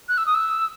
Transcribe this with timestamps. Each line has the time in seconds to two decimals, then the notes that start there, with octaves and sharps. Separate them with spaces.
0.09 F#6
0.18 E6
0.26 D#6
0.35 E6